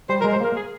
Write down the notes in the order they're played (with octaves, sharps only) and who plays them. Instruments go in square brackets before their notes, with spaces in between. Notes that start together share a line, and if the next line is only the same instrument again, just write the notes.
[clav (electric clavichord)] G3 [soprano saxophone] C5
[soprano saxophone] A#4
[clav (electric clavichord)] G#3
[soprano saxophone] C5
[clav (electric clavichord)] A#3 [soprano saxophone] A#4
[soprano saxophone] G#4